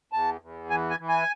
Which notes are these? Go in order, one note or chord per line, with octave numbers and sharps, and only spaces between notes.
E2 A5
E2
E3 G#5
G#5
E3
G#5